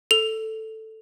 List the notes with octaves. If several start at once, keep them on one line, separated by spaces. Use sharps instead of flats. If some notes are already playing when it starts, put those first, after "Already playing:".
A4 F7